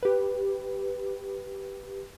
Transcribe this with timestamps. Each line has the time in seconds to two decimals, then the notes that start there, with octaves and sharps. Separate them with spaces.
0.03 G4 B4